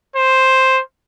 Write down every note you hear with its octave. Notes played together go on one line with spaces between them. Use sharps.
C5